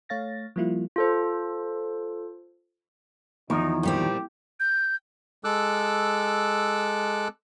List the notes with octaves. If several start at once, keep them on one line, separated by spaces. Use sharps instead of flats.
A3 C#5 F5 A6 A#6
F3 G3 A#3 E4 F4
F4 A4 C5
E2 D#3 F3 D#4
A#2 G3 C4 G4
G6
G#3 A4 D6 E6 F#6